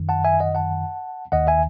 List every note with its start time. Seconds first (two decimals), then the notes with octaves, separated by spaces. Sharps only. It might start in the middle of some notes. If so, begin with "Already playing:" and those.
Already playing: F#2 D#3
0.09 F#5 A5
0.24 E5 G#5
0.40 D#5 F#5
0.55 F#5 A5
1.32 D#2 D#3 D#5 F#5
1.47 E5 G#5